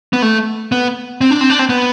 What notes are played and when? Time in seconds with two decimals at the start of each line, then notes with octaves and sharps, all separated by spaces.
0.13 B3
0.22 A3
0.72 B3
1.21 C4
1.31 D4
1.41 C4
1.50 D4
1.59 C4
1.69 B3